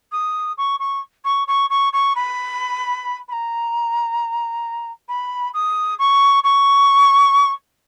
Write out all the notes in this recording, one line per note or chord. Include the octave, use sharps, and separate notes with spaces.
D#6
C#6
C#6
C#6
C#6
C#6
C#6
B5
B5
A#5
B5
D#6
C#6
C#6